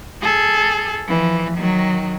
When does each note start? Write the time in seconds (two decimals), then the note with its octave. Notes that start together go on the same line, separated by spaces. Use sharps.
0.22 G#4 A4
1.07 E3 F3
1.57 D#3 F#3